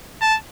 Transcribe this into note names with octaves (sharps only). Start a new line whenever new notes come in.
A5